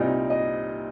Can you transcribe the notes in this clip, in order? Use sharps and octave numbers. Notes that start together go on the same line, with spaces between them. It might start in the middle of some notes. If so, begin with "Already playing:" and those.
Already playing: C2 A#2 G3 C4 D#4 D5
D#5